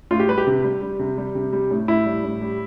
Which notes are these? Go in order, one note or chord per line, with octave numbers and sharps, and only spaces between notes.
A2 F4
G4
G3 B4
G4
C3
G3
G3
C3
G3
C3
G3
A2
A2 E4
G3
A2
G3